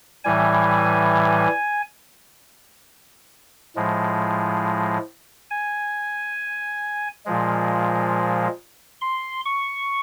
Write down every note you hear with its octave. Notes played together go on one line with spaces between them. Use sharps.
A2 E3 G3 G#5
A2 F3 G#3
G#5
A#2 F3 G#3
C6
C#6